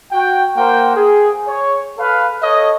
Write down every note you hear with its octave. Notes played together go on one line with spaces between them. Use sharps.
F#4 G5
A#3 A#4 C5 F#5 G5
G#4
C#5
A4 B4 F5
A4 C#5 D#5